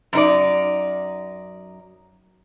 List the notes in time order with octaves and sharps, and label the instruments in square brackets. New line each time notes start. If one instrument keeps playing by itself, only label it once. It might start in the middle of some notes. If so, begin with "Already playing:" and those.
[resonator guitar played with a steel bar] F#2 D#4 D5